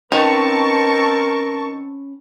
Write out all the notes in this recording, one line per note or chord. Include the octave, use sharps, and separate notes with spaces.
D#3 C4 C#4 A#4 B4 A5 C#6